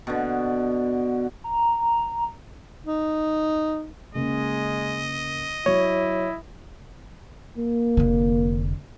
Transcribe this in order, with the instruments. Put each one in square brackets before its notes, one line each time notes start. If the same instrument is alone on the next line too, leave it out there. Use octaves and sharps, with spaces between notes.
[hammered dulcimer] B2 D3
[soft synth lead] A#5
[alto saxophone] D#4
[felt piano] C#3 A#3 [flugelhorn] G#3 [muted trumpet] D#5
[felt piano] F#3 [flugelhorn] E4 [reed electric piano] C#5
[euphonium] A#3
[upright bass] F1 D3